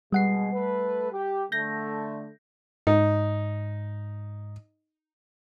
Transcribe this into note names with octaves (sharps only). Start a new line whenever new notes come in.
B2 G3 G#3 F#5 C7
A3 A4 B4
G4
D3 A3 G6 A#6
G#2 D#4